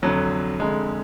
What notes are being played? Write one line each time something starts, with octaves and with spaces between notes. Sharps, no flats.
F1 F2 D3 F#3
F1 F2 D3 G#3